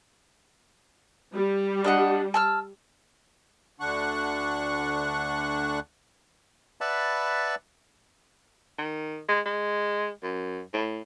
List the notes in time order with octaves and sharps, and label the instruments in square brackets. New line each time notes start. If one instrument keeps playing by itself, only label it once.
[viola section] G3
[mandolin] D4 D#5 F#5
A5 E6 F6
[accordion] D2 D3 D4 F#5 C#6 F#6
[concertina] B4 D5 E5 F#5 A5 B5
[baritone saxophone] D#3
G#3
G#3
F#2
A2